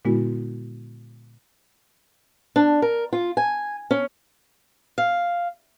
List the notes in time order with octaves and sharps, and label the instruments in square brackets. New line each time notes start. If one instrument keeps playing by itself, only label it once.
[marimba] A#2 D3 G#3 B3 E4 F#4
[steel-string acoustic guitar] D4
A#4
F4
G#5
C#4
F5